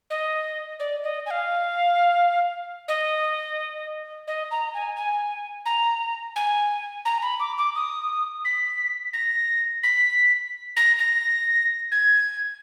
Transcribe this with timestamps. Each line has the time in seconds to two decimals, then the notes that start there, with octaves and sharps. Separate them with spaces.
0.10 D#5
0.80 D5
1.03 D#5
1.26 G#5
1.31 F5
2.88 D#5
4.27 D#5
4.51 A#5
4.74 G#5
4.96 G#5
5.66 A#5
6.36 G#5
7.05 A#5
7.22 B5
7.40 D6
7.58 D6
7.75 D#6
8.45 B6
9.13 A#6
9.83 B6
10.76 A#6
10.99 A#6
11.91 G#6